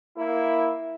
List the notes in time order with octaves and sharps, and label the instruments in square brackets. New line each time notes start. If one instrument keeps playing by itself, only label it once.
[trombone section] A#3 E4